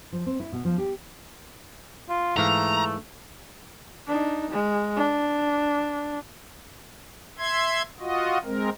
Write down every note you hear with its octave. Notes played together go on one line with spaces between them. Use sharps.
F3
C4
E4
B2
F3
G4
F4
G#2 E3 A3 F5 A#5
D4 D#4
G#3
D4
E5 C6 G#6
F4 F#4 D#5
G#3 C4 A#4